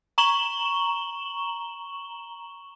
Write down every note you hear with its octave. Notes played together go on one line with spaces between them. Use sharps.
A#5 C#6 E7 F#7 G7